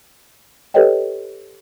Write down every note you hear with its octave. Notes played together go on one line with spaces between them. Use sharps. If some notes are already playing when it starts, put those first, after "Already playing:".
G4 A4 B4 C#5 D#5 G5